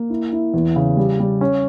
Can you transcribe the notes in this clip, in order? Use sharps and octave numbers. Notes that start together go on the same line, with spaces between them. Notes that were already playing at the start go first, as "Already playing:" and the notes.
Already playing: A#3
E4
E4
E2
C#3
G3
G3
C#4